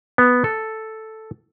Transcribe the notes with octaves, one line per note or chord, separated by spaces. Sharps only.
B3
A4